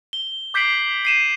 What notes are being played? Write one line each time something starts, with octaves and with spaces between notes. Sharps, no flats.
G7
D6 G6 B6 C7 D7 F#7
C7 D#7 E7